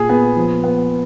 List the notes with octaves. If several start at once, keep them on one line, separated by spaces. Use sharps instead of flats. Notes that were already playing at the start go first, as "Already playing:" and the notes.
Already playing: A#2 G#4 G#5
B3
F3
B3